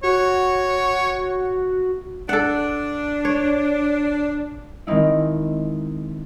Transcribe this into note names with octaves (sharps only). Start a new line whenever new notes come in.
F#4 C#5
D4 A4 F#5
C#5
D#3 G#3 C4 D#4 E4